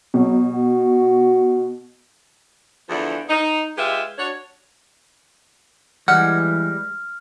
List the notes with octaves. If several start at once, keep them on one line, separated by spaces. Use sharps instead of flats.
B2 F#3
F#4
E2 D3 E3 F3 D4
D#4
G#3 F4 G4 B4 E5
D4 F#4 C#5
E3 G3 G#3 F#5 F6